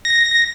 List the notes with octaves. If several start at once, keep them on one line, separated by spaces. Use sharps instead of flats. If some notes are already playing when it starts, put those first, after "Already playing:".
A#6